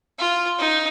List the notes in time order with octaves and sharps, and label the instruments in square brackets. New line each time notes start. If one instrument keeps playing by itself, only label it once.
[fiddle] F4
D#4